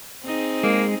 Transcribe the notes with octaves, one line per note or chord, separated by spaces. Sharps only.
C4 D#4 G#4
G#3 A#3